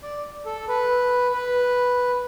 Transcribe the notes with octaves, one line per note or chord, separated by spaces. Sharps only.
D5
A4
B4
B4